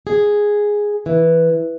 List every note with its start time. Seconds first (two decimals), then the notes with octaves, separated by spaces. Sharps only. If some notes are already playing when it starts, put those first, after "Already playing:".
0.07 G#4
1.06 E3